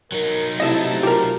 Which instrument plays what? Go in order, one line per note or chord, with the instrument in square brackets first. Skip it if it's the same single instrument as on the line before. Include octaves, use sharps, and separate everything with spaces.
[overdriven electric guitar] F#3 D#4 [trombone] A#4
[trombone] C3 [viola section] A3 E4 A5 [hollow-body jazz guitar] D#5 E5
[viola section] F4 [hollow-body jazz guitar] G4 A#4